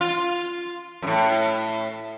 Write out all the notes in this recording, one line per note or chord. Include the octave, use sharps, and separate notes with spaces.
F4
F#2 A2